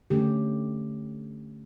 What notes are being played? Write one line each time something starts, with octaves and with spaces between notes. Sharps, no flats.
D3 A3 C#4 G4